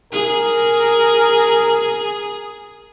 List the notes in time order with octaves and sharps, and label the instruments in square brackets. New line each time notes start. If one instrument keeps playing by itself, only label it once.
[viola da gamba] G#4 [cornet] A#4